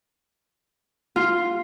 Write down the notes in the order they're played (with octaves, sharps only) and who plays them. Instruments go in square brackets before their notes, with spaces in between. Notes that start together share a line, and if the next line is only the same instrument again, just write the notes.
[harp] F4